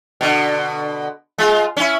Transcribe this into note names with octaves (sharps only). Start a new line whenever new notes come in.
B2 D3
G#3 F4
C#4 E4